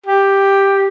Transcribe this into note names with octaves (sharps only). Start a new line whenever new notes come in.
G4